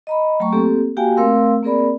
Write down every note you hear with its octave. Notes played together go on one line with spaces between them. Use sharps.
D#5 A#5 B5
F#3 A3 G5 A#5 C#6
A#3 C4 G4 A4
A#3 F#4 G4 F5 G5 G#5
A3 C4 A#4 F5 C6 E6
A#3 C4 G#4 A#4 D5 B5